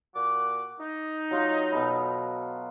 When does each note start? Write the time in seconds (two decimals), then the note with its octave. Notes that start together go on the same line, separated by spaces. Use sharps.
0.15 A#2 F#4 D6
0.80 D#4
1.31 F#3 F4 F#4
1.72 B2 A4 B5